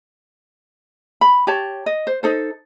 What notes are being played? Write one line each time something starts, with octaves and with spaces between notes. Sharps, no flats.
B5
G4 C#5 A5
D#5
C5
D#4 A4 C5